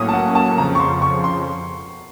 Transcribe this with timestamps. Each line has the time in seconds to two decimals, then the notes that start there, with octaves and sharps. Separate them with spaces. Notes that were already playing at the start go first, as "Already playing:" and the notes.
Already playing: A2 F#3 A#3 C#4 D#6
0.09 A5
0.13 F#5
0.35 A5
0.57 F2 C#3 F3 A#5
0.75 C#6
0.80 C6
1.02 C#6
1.24 C6